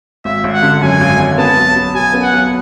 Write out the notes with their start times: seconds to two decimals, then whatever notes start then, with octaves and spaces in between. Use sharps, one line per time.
0.25 G#1 E5
0.44 G#1
0.53 F#5
0.63 D3
0.81 F#2 G#5
1.01 G#1
1.19 G#1
1.38 B3 A5
1.57 B1
1.76 F#3
1.94 B2 G#5
2.14 B3
2.22 F#5
2.32 B1